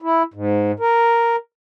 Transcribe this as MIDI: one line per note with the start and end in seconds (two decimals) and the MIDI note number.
0.02 0.23 64
0.34 0.72 44
0.80 1.36 70